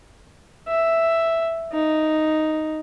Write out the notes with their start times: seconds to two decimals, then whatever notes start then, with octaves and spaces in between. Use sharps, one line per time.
0.68 E5
1.73 D#4